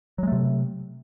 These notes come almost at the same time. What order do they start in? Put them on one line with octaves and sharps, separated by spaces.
F#3 G#3 A3 C3